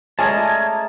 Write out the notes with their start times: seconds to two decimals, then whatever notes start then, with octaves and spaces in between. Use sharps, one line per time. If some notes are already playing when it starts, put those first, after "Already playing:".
0.19 G#3 A3 C#4 G#4 D5 A5 A#5 G#6